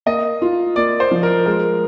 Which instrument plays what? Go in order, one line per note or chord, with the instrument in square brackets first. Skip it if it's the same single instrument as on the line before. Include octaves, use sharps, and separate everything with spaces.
[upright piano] A#3 [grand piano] D#5
[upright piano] F4
[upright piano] A#3 [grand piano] D5
[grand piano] C5
[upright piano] F3
[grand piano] A#4
[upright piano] G#3 [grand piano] A#4